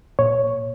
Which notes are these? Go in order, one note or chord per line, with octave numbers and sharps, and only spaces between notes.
A#2 C#5